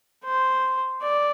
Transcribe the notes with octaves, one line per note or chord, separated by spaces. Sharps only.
C5
D5